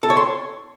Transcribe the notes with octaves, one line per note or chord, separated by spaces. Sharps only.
A4
C#5
C6